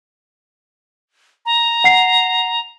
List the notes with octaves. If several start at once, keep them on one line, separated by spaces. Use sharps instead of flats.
A#5
F#5 C7